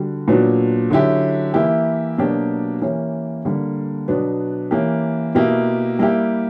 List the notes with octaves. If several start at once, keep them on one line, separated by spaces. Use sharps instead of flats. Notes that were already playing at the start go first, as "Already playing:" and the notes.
Already playing: D3 G3 F#4
A#2 F#3 B3 D4 F#4
D3 F#3 C#4 E4 G4
E3 A#3 E4 G4
B2 F#3 A#3 D4 G4
E3 A#3 C#4 G4
D3 G3 A#3
B2 F#3 B3 D4
E3 A#3 C#4 G4
B2 A#3 E4 G4
G3 A#3 E4 G4